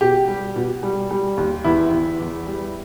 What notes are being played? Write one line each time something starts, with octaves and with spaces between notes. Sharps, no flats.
B2 G4
G3
B2
G3
G3
D#2
E2 E4
E2
E2
G3